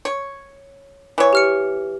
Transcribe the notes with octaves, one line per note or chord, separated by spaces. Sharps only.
C#5
E3 C#5
G4 F6 C#7